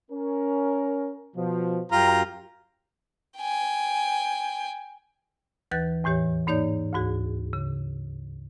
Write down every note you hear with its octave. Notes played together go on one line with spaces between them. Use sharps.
C#4 A#4
B2 F3
F#2 F4 G4 A#5
G5 G#5
D#2 E3 B4 F#6 A6
E2 A2 E3 G4 C#5
G#2 A#3 D#4 C#5 D5 G6
D2 G#2 F#4 G#4
C#3